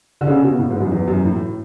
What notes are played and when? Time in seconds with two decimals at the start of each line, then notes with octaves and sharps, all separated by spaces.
0.21 D3
0.27 C#3
0.44 B2
0.59 A2
0.70 G#2
0.80 F#2
0.91 E2
1.08 F#2
1.25 A2